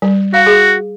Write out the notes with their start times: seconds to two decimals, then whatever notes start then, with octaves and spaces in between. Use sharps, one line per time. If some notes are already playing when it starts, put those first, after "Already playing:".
0.02 G3
0.34 F#4 F5
0.46 G#4